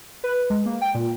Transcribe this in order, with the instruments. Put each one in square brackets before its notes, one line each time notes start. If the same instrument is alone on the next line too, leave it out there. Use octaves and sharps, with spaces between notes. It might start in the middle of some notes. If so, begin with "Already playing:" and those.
[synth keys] B4
G#3
A#3
G5
A#2